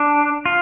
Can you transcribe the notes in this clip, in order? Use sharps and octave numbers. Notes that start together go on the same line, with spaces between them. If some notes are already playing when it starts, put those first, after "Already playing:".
Already playing: D4
F4